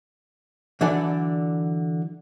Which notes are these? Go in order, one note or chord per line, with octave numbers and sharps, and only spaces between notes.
D3 E3 F#3 D4 A4 D5